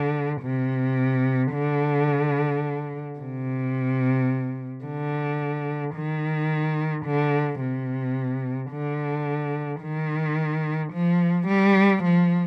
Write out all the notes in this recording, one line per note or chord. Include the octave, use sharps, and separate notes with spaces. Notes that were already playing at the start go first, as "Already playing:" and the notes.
Already playing: D3
C3
D3
C3
D3
D#3
D3
C3
D3
D#3
F3
G3
F3